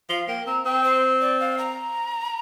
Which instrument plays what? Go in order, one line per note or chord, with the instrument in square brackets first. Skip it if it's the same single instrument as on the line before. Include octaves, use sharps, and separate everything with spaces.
[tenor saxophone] F3 [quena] F5
[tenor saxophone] A#3 [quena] G5
[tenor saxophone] C4 [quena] A#5
[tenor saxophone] C4 [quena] G5
[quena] C5
D5
F5
A#5